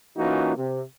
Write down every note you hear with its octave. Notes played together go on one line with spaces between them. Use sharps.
E3 A#3 C#4 D#4 F4 F#4
C3